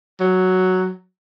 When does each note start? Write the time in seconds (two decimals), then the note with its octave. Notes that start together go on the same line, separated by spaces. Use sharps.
0.20 F#3